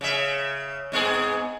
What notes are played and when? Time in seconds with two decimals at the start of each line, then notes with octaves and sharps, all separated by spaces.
0.01 C#3 E5
0.92 G#2 B3 G#4